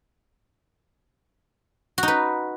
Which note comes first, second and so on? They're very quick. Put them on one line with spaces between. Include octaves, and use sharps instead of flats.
F#4 D#4 B4